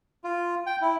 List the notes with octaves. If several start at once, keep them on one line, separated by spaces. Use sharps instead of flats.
F4
G5
E4